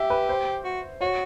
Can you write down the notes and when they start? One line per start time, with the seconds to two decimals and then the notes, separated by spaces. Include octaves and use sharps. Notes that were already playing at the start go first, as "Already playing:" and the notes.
Already playing: G4 E5
0.10 B4
0.29 C5
0.64 F#4
1.01 F#4 C#5